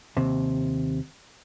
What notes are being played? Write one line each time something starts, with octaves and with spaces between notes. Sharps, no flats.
D#2 C3